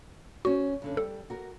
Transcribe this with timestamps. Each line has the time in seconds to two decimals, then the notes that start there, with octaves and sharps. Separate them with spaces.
0.45 C#4 F#4 C5 C#5
0.82 G2 D3 C#4
0.97 G3 A4
1.30 F#4 A#4